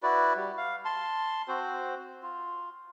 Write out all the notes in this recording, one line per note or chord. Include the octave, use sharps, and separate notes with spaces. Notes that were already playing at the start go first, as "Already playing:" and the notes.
E4 F#4 B4 D5
G3
F5
A5 C6
C4 F#4 C5
F4